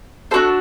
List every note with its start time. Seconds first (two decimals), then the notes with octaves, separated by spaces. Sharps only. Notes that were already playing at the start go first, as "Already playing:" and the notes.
0.31 D4 F#4 A4 C5